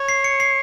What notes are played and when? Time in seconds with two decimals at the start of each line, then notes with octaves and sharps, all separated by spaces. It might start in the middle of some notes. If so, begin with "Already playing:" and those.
Already playing: C#5
0.09 C7
0.24 C#7
0.40 C7